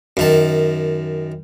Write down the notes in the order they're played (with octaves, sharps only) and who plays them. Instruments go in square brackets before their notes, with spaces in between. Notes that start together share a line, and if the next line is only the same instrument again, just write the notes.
[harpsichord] F#2 D#3 A5